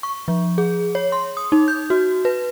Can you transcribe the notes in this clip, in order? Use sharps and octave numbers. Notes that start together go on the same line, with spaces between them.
C#6
F3
G#4
C#5
C6
D#6
D#4
G6
F#4
B4